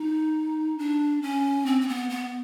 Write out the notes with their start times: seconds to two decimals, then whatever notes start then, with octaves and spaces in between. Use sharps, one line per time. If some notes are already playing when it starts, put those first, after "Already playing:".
Already playing: D#4
0.78 D4
1.22 C#4
1.66 C4
1.81 C4
1.88 B3
2.09 B3